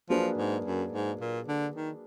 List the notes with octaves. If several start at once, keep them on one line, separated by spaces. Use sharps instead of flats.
F3 F#3 A#3 D4 G#4 B4
G#2
F#2
G#2
A#2
D3
D#3